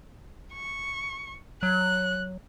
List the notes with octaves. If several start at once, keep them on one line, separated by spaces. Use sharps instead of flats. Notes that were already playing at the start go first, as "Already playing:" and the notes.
C#6
F#3 F#6